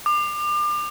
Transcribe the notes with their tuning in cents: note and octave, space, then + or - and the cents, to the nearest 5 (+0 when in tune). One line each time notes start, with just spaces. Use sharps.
D6 +35